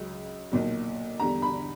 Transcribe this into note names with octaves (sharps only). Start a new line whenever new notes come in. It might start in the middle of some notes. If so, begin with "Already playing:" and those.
Already playing: C#2 C#3 F#3
B1 A#2 F#3
E2 D3 G3 A#5
B5